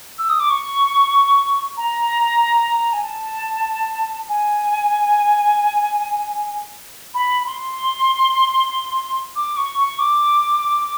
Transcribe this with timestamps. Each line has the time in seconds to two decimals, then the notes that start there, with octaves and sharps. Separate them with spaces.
0.19 E6
0.29 D#6
0.40 D6
0.50 C#6
1.77 A#5
2.93 G#5
3.03 A5
4.29 G#5
7.14 B5
7.46 C6
9.36 D6
9.57 C#6
9.78 C#6
9.99 D6